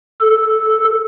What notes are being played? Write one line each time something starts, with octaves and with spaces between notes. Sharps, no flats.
A4